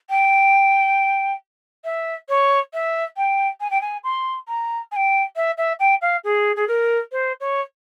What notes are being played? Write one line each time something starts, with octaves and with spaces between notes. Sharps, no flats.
G5
E5
C#5
E5
G5
G#5
G5
G#5
C6
A#5
G#5
G5
E5
E5
G5
F5
G#4
G#4
A#4
C5
C#5